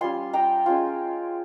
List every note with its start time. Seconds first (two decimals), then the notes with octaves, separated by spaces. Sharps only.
0.01 G3 C#4 F4 G#5 C6
0.33 G5 A#5
0.66 G#3 C#4 F4